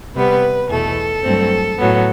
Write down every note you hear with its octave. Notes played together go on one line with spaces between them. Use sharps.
C3 G3 B3 B4
E2 B2 A3 A4
G2 F#3 A3 C4
A2 F#3 B3